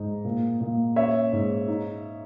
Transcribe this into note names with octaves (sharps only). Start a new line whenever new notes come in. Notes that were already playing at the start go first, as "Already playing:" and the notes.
Already playing: G#2 D#4
A#2
A#2
C#4 C#5 E5
G#2
D#4